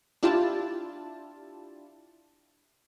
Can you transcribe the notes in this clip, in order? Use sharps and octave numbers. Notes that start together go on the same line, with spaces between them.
D4 E4 F4 G4 A5